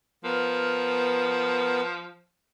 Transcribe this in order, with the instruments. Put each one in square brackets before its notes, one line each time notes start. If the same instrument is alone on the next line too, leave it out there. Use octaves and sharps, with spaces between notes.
[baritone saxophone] F3 [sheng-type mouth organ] B3 A#4 F#5